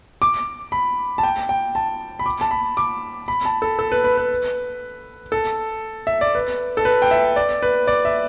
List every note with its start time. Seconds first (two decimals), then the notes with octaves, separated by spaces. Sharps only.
0.22 D6
0.72 B5
1.18 A5
1.23 G5
1.49 G5
1.75 A5
2.19 B5
2.26 D6
2.41 A5
2.51 B5
2.77 D6
3.28 B5
3.45 A5
3.62 A4
3.79 A4
3.92 B4
4.04 B4
4.17 B4
5.32 A4
6.07 E5
6.21 D5
6.35 B4
6.77 A4
6.85 B4
7.02 G5
7.11 E5
7.36 D5
7.63 B4
7.87 D5
8.05 E5